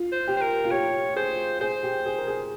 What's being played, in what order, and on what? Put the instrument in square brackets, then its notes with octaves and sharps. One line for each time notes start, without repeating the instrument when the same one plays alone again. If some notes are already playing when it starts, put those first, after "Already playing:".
Already playing: [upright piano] F4
[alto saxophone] C5
[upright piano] G4
[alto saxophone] C5
A#4
[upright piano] F4
[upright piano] G4 [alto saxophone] C#5
[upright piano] G#4 [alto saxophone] C5
[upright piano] G#4 [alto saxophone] C5
[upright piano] G4
G#4
A#4
G#4